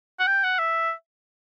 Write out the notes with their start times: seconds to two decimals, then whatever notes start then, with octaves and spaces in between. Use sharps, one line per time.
0.19 F#5
0.27 G5
0.44 F#5
0.59 E5